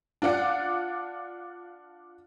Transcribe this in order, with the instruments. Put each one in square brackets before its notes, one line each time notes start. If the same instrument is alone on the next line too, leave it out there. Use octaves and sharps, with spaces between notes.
[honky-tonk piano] D4 F4 D5 F#5